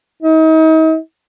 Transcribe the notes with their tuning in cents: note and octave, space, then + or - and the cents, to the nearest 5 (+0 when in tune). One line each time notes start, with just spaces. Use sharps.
D#4 +40